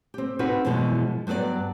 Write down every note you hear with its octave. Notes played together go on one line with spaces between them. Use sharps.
C4 G4
C4 D#4 F4 F#4 G#4 B4
F#2 B2 E3 F3 G#3
G2 F#3 B3 G4 D5